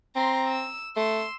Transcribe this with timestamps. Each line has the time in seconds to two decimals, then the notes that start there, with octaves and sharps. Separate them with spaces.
0.16 C4 A#5 C6
0.47 E6
0.96 A3 C6 E6